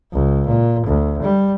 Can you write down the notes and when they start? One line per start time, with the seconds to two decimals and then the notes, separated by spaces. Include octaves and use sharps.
0.13 C#2
0.47 A#2
0.87 D2
1.22 G3